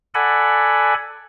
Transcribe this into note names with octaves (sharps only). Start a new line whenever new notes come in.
A4 D5 F#5 G#5 B5